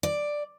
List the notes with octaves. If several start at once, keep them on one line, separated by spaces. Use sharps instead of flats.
D5